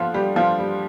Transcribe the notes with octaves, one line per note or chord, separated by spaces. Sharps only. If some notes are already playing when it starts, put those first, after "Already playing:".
Already playing: D3 F3 F4
G3 G4
F3 F4
G3